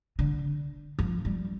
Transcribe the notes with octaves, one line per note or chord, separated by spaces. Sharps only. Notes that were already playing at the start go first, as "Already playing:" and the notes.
D3
F3
G3